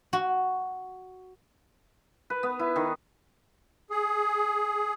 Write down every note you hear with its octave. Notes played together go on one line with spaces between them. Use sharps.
F#4
B4
B3
E4
D#3
G#4